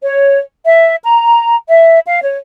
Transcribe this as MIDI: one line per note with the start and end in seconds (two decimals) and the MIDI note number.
0.02 0.40 73
0.66 0.96 76
1.04 1.56 82
1.68 2.00 76
2.08 2.19 77
2.22 2.37 73